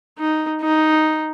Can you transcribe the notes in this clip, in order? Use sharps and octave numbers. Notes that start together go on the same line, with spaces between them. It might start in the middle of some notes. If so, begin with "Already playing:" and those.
D#4
D#4